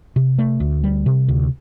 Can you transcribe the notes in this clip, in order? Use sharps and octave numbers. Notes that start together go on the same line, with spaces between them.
C3
A3
D2
G3
C3
D2